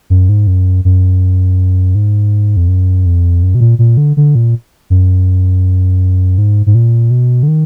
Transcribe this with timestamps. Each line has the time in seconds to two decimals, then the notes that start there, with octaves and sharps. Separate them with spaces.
0.10 F#2
0.29 G#2
0.47 F#2
0.85 F#2
1.95 G#2
2.57 F2
2.68 F#2
3.06 F2
3.43 F#2
3.55 B2
3.60 A#2
3.79 A#2
3.97 D3
4.17 D3
4.35 A#2
4.90 F#2
6.38 G#2
6.66 G#2
6.75 A#2
7.11 B2
7.43 D3
7.48 D#3